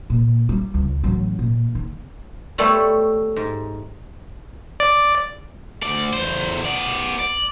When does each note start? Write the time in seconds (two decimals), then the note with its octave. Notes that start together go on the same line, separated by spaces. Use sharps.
0.10 A#2
0.49 G3
0.74 C#2
1.03 A1 F#3
1.39 A#2
1.75 D#3
2.58 G3 A3 B3 A4 C5 C#5
3.36 G#2
4.80 D5
5.83 D2 D5
6.13 E2 C5
6.64 B3 D5
7.19 D5